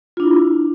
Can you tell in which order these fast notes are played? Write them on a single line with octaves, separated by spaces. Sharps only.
F4 D4 E4